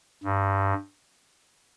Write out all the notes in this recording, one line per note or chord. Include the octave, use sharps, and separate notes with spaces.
G2